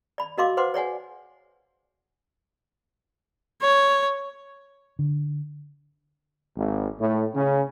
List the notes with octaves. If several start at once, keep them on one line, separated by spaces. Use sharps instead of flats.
D5 B5
F#4 A#4 D#5 F5 C6 D6
B4 C5 F#5 C6 D6
C#5 D5 F#5 G#5
C#5
D3
G#1
A2
C#3